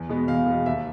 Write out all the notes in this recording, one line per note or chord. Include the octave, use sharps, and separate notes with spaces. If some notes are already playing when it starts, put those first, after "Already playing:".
Already playing: E2
B2 G#3 B3
E2 F5
B2 G#3 B3
D#2 E5